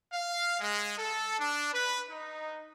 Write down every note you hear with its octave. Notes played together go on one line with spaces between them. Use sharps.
F5
G#3
A4
D4
B4
D#4